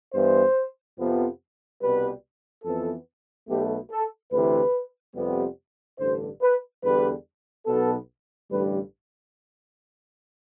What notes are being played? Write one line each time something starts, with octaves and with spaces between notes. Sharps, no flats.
G2 E3 B3 C5
F2 C3 F3 B3
C2 B2 G3 B4
F2 E3 B3 A4
B1 B2 A3 G4
A4
D2 C3 E3 B4
F2 C3 G3 B3
A1 G2 D3 C5
B4
E2 D3 G3 B4
B1 B2 B3 A4
A1 G2 D3 G3 B4